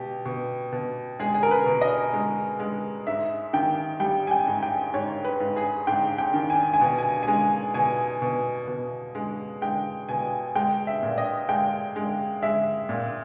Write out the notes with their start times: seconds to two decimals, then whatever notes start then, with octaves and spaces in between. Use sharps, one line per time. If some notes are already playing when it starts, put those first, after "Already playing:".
Already playing: B2 G4
0.26 B2
0.72 B2
1.19 G#3 G#4
1.34 G#4
1.43 A#4
1.51 B4
1.66 B2
1.81 D#5
2.13 G#3
2.59 G#3
3.07 G#2 E5
3.53 D#3 G5
4.00 G3 G5
4.27 G#5
4.31 G5
4.47 G#2
4.63 G5
4.94 G#2 C#5
5.25 B4
5.40 G#2
5.56 G#4
5.87 G#2 G5
6.18 G5
6.34 D#3
6.50 G#5
6.74 G#5
6.81 B2
6.98 G#5
7.23 G#3 G#5
7.74 B2 G#5
8.22 B2
8.68 B2
9.15 G#3
9.62 G#3 G5
10.09 B2 G#5
10.55 G#3 G5
10.87 E5
11.03 A#2
11.18 D#5
11.49 G#3 G5
11.96 G#3
12.43 G#3 E5
12.89 A#2